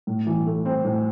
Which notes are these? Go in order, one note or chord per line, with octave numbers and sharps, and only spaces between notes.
A2
E3
A3
C4
A2